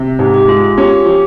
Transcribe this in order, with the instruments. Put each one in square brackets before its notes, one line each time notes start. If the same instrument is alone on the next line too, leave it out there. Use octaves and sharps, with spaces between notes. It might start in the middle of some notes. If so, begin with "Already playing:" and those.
Already playing: [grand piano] C3
[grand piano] G#2 [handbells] G4
[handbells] G4
[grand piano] G#3 [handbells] F4
[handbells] F4
[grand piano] C#4 [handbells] G4
[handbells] G4
[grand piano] F3 [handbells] G4